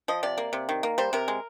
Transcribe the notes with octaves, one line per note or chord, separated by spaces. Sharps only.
F3 D#5
C3 D5
A#3
C3
D#3
A#3
G3 C5
C3 A#4
G#3